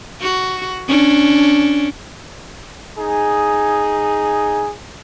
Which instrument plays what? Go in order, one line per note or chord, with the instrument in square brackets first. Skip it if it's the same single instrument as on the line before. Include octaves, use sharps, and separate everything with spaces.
[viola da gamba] F#4
C#4 D4
[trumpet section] D#4 G#4